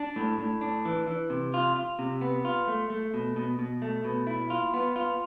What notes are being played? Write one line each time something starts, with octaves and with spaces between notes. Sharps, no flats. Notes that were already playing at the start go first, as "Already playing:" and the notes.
Already playing: D4
A2
A2
D4
E3
E3
C3
F4
F4
C3
B3
F4
A3
A3
B2
B2
B2
A3
B2
E4
F4
B3
F4